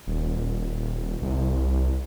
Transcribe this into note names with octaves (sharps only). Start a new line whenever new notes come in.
D#1
C2